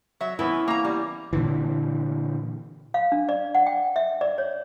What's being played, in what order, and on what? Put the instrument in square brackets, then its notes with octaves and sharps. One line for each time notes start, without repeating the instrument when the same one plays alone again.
[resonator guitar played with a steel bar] F#3 E5
[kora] E3 B3 C#4 [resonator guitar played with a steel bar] E4
[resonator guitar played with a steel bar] A#3 A#5
G3
[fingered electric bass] A#2 D3 E3
[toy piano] F5
D4
D5
F#5
G5
E5
D5
C#5